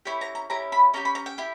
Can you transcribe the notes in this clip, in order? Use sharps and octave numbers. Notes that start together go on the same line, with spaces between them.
C#4 E4 G4 B5
A#5
A#5
C#4 E4 G4 A#5
B5
C#4 E4 G4 A#5
B5
A#5
G5
E4 G4